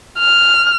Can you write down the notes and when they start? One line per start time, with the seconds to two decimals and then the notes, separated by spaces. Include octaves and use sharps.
0.18 F6